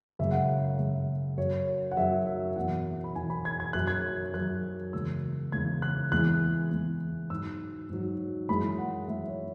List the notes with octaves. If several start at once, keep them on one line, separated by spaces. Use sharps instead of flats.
F#2 C#3 G#3 E5
F#5
E5
F#2 C#3 G#3
F#2 F#3 C#5
F#5
F#2 F#3 E5
E5
E2 B2 F#3 F#5
B5
E2 B2 F#3 G#5
B5
G#6
G#6
F#2 F#3 F#6
G#6
F#2 F#3 F#6
E2 C#3 G#3 E6
E2 C#3 G#3 G#6
F#6
E2 E3 G#3 F#6
E2 E3 G#3
G#2 F#3 E6
G#2 F#3
F#2 E3 G#3 B5
F#5
F#2 E3 G#3 E5
C#5